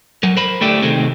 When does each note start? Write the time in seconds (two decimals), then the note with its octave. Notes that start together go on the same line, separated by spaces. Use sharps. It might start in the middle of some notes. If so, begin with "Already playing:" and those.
0.23 F#3 A#4
0.37 A#4 C5 B5
0.61 D3 A3 D4 E4 G4
0.82 C3 D#3 G#3 A3 C4